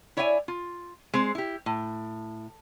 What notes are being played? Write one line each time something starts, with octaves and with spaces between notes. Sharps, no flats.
E4 C#5 D5 E5 G5 G#5
F4
G#3 C4 C5
E4 G4
A2